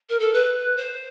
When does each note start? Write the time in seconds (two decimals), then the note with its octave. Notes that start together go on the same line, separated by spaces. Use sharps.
0.10 A#4
0.20 A4
0.34 B4
0.77 C5